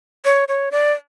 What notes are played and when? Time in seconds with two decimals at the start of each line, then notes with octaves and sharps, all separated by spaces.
0.25 C#5
0.48 C#5
0.72 D5